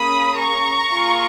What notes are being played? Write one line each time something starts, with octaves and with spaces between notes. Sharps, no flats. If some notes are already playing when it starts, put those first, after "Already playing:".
Already playing: A#3 C#4 G#4 B5 D#6
A#5 C#6
A#3 F4 G#4